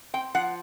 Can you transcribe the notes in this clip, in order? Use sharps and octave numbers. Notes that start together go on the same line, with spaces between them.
C4 G5
F3 F#5